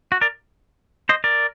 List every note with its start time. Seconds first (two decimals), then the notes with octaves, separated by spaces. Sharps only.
0.12 F#4
0.21 A#4 D5
1.09 C5 D#5
1.24 A#4 D5